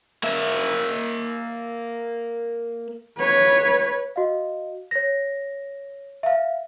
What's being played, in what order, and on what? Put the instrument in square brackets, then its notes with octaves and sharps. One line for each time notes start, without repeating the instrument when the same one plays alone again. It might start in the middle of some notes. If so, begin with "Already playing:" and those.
[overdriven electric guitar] A#3 E5
[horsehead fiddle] B4 C#5
[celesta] F#4 D#5 F5
C#5 A#6
E5 F5